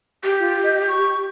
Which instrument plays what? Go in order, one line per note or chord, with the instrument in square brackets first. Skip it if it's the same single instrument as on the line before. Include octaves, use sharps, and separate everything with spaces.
[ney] G4
[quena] F4
D#5
C#6